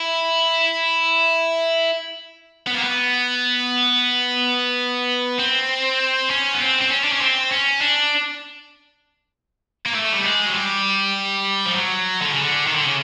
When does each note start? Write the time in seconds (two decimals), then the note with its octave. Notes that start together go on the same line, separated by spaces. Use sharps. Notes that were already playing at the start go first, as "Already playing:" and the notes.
Already playing: E4
2.67 B3
2.75 A#3
2.84 B3
5.39 C4
6.30 C#4
6.54 B3
6.60 C4
6.81 C4
6.91 C#4
7.04 D4
7.13 C#4
7.21 C4
7.52 C#4
7.81 D4
9.86 A#3
9.94 A3
10.12 G3
10.24 G#3
10.46 F#3
10.54 G3
11.66 F3
11.75 F#3
12.21 D3
12.31 C#3
12.41 D3
12.67 D#3
12.75 D3
12.85 C#3